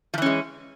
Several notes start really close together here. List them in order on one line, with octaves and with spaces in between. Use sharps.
F3 E3 C#4 G#3